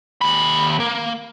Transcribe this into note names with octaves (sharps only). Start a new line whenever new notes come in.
D#2 B5
A#3